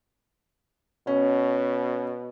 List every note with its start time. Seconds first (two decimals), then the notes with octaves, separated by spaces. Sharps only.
1.07 B2 C#4